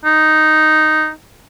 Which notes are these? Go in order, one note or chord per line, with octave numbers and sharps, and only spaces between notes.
D#4